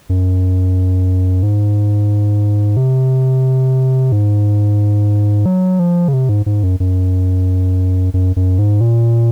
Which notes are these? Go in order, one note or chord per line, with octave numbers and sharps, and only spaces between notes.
F#2
G#2
C3
G#2
F#3
F3
C#3
C3
G#2
G#2
F#2
F#2
F#2
F#2
G#2
A#2